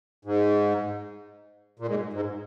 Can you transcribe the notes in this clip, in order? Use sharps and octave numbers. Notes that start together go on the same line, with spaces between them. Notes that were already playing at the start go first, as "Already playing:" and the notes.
G#2
A#2
G#2
G#2